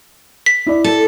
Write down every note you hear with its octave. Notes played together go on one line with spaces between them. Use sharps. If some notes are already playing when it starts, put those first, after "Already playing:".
B6
E4 D5
A4